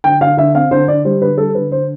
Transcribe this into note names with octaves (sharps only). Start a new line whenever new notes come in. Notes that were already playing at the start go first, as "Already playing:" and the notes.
D3 G5
D3 F5
D3 E5
C4 F5
D3 C5
D3 D5
G3 C5
D3 B4
G3 A4
D3 B4
D3 C5